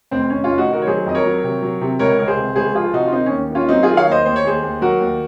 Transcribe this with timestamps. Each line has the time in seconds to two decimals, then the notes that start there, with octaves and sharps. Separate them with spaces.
0.11 F1 C4
0.30 F1 C#4
0.44 C#4 F4
0.50 F1
0.58 D#4 F#4
0.68 D#3 F#4 A#4
0.82 C#5
0.86 F#3 G#4 C5
1.06 F2 D#5
1.15 A#4 C#5
1.25 F#3
1.44 C3
1.62 F#3
1.81 C3
1.99 C#2 A#4 C#5
2.19 C#2 A#4
2.28 G#4 C5
2.37 C3
2.56 C#2 G#4 C5
2.75 F3 F4 G#4
2.93 C3 D#4 F#4
3.06 F4
3.12 D#3 C4 D#4
3.26 C#4
3.31 D#2
3.50 D#3 C#4 F4
3.69 F#3 C4 D#4
3.83 D#3 F4 G#4
3.97 C#5 F5
4.07 D#2 C5 D#5
4.26 D#2 C5
4.36 C#5
4.45 D#2 G#4 C5
4.63 D#2
4.81 F#3 F#4 A#4
5.00 D#2